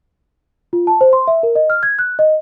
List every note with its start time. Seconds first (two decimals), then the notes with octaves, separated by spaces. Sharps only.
0.73 F4
0.87 A5
1.01 C5
1.13 C6
1.27 E5
1.43 A#4
1.55 D#5
1.70 F6
1.83 G#6
1.99 F#6
2.19 D#5